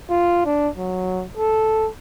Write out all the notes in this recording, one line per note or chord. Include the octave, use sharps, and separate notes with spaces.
F4
D4
F#3
A4